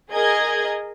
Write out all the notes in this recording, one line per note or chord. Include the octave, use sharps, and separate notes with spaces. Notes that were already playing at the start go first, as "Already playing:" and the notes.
G#4 A#4 D#5 G#6